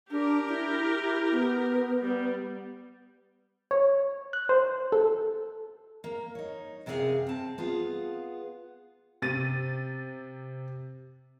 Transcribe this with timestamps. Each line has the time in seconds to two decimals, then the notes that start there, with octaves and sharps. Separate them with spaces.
0.11 D4 G4 A#4
0.49 E4
0.95 E4
1.32 B3
2.01 G3
3.71 C#5
4.33 F#6
4.49 C5
4.92 A4
6.04 A#3
6.35 D#4 C#5
6.86 F#2 C3 B3 C#4 G#4 F5
7.27 C4 A5
7.58 B3 F4 G#4 F5
9.22 C3 A6 D#7